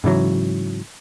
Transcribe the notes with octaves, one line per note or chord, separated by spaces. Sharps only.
G#2 C#3 E3 F#3